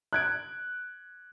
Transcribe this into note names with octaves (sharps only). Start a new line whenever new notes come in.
F#6 G#6 D7